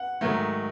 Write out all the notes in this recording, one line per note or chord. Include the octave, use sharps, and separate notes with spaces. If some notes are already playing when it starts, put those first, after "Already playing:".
Already playing: F#5
G#2 D#3 F#3 A3